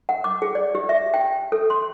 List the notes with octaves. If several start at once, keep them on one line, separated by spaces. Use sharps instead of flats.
F#5
D6
G#4
D5
G4
E5
G5
A4
C6